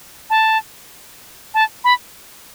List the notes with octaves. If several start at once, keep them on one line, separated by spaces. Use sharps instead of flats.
A5
A5
B5